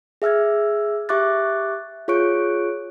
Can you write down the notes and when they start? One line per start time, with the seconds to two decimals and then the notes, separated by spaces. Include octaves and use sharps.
0.22 G#4 E5 E6 F6 G#6
1.09 G4 E5 C#6 D6 F#6 A6
2.08 F4 G#4 C#5 C#6 F#6 D7